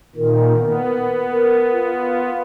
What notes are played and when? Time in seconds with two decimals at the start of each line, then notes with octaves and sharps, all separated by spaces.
0.15 A#2 D#3 A#4
0.58 B3
1.30 A#4
1.71 F4